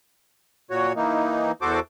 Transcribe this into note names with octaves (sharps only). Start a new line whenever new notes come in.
A#2 F#4 C#5
E3 A#3 D#4
E2 F#4 A4 C5 D6